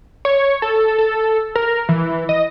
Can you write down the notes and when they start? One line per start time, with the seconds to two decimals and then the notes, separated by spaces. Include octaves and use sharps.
0.25 C#5
0.62 A4
0.98 A4
1.55 A#4
1.89 E3
2.29 D#5